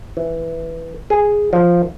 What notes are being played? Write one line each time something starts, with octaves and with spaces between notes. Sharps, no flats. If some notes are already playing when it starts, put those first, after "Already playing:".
E3
G#4
F3